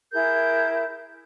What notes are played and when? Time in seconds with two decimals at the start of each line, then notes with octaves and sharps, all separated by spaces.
0.12 E4 G#4 A#4 G6